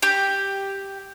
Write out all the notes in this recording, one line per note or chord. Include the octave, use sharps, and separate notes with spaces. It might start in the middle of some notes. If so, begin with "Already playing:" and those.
G4